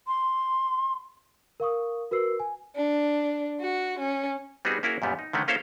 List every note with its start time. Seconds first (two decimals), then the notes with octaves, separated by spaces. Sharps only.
0.07 C6
1.60 A#4 F5 C#6 D#6
2.11 F#4 A#4 B4 E6 C7
2.40 G#5
2.75 D4
3.60 F#4
4.00 C#4
4.65 G3 B3 C4 D#4 F#4 G#4
4.83 A#3 C#4 E4 F#4 G#4 A#4
5.02 F#2 A#2 G3 B3
5.19 D#4
5.33 D3 D#3 A3 C#4
5.48 A#3 C#4 E4 A4 C5 F5